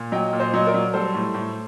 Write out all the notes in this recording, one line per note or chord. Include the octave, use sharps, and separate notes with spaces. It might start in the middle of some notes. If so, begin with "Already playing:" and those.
Already playing: A#2
F#3 D#5 G5
A#2
C5 D#5
F#3 D#5
A#4 D5
F#3
G3 A4 C5
A2
A2